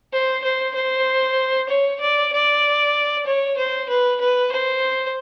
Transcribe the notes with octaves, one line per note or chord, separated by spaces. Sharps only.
C5
C5
C5
C#5
D5
D5
C#5
C5
B4
B4
C5